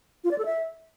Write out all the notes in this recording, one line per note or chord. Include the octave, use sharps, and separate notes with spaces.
F4
D5
A4
E5